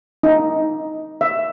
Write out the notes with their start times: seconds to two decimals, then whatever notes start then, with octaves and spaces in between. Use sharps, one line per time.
0.23 D#4
1.21 E5